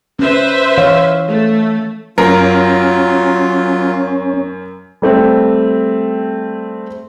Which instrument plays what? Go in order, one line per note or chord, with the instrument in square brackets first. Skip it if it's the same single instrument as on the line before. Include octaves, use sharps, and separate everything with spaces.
[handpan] C#4 [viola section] B4 C5 E5
[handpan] E3 C#5 F5
[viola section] A3
[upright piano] F#2 A#4 [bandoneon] F#3 F4 [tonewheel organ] C#4
[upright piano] G3 A3 C4